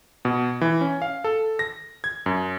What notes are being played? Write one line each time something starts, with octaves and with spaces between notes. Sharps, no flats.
B2
E3
C#4
F5
A4
A#6
G#6
F#2